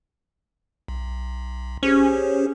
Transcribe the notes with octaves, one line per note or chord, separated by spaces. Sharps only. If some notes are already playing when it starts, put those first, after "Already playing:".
B1
C#4 G4 G#4 C5